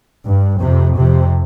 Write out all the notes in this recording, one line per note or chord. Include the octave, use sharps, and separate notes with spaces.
G2
F2 C3
F2 C3